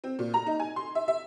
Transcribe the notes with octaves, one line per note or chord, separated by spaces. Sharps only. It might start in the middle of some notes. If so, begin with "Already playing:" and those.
C4
A#2
A#5
D#4
G#5
C6
E5
E5